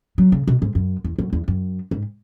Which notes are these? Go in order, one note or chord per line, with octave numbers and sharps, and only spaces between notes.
F#3
C#3
B2
G#2
F#2
E2
F#2
E2
F#2
G#2